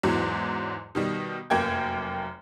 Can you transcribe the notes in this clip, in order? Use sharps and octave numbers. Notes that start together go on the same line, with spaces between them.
E2 G#2 E3 F#3
B2 D#3 G3
F1 F#2 A#3 G5 G#6